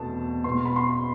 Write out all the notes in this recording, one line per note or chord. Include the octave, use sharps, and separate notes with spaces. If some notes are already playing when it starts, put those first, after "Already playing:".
Already playing: E2 B2 A3 C4 A5
B2 B3 C6
B5
C6